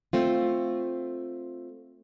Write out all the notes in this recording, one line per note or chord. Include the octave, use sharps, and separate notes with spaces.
A3 C4 F4